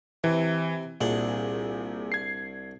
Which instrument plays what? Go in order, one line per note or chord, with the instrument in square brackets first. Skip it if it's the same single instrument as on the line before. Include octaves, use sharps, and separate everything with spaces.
[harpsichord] C3 [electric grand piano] E3
[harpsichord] C2 D4 F#5 [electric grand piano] A#2 G#4
[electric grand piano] G#6 C7